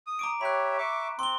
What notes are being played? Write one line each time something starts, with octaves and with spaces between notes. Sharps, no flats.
D#6
A#5 D6 D7
G4 C#5 E5 B5 F#6
E5 C#6 D6
C4 C6 G7